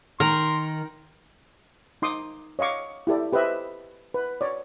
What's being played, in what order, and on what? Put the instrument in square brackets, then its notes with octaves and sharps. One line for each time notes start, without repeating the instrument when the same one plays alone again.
[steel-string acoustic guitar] D#3 [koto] A#4 [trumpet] C6
[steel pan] D#4 C6 D6 D#6
C#5 D#5 F5 C#6 D6
E4 G4 A4 D5
G4 B4 C5 D#5 E5
B4
C#5 D5